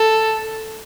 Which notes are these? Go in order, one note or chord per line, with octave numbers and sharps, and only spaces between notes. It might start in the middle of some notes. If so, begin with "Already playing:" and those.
Already playing: A4